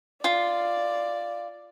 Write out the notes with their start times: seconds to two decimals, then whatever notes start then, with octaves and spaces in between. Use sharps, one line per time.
0.24 F4 D5